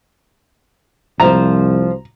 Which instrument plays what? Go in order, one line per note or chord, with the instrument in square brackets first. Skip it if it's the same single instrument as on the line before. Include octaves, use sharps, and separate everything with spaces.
[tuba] C2 [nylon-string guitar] F3 C5 [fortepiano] A#5